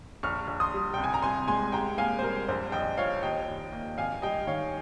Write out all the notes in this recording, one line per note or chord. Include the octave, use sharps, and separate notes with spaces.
A#1 C#6 F6
A#1
C6 D#6
G3
C2 G5
G#5
A#5
C2 G#5 C6
G#3 G#5 C6
C2 G5 A#5
A#3 F5 G#5
C5
G3 A#4
A#1 C5
A#1 D#5 G5
F3 C#5 F5
D#2 D#5 G5
D#2
A#3
G#1 F5 G#5
G3 D#5 G5
D#3 C#5 F5